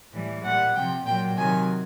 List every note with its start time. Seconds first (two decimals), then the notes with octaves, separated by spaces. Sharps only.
0.12 A2 E3 G3
0.43 A#2 G3 F#5
0.74 C3 F3 G5
1.05 A#2 F#3 G5
1.37 C3 D#3 F#3 G#5